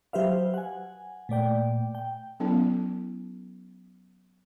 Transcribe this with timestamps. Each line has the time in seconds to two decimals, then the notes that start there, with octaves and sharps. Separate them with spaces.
0.13 F#3 G4 B4 C5 E5 F5
0.54 F#5 G#5
1.29 A#2 A3 D5 G5
1.95 G5
2.40 F#3 B3 C#4 E4 A4